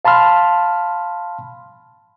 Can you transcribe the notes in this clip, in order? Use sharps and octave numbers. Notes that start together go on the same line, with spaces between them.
F5 A5 B5 C6 F6